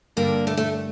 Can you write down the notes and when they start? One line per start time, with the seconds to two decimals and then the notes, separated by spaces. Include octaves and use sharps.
0.17 G2 D3 G3 A#3 D4
0.47 A3
0.57 A3